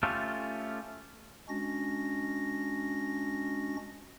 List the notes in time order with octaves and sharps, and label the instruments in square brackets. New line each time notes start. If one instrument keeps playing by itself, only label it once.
[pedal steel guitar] A3 C#4 F4 G4 A4
[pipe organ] G#3 C#4 D4 F#4 A#6